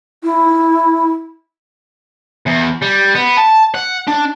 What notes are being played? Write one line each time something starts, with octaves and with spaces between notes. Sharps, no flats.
E4
E2
G3
B3
A5
F#5
D4